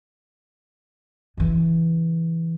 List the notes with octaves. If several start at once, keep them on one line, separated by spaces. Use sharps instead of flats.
C#3 E3